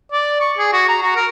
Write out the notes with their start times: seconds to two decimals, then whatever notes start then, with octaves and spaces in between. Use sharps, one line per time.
0.12 D5
0.40 C#6
0.58 G#4
0.73 F#4
0.88 A#5
1.02 F#4
1.16 A#4